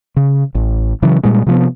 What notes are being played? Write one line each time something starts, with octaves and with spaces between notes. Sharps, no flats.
C#3
A1
C#3 E3 F#3
A#2 G3 G#3
C3 F3 A#3 B3